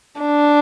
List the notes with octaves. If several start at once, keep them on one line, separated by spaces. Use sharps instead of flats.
D4